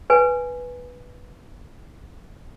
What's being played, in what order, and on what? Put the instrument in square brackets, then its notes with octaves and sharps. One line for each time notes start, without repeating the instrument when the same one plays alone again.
[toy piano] B4 G#5